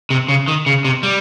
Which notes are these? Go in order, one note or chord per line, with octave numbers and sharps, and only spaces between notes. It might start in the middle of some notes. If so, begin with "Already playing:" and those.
C3
C#3
D#3
C#3
C3
G3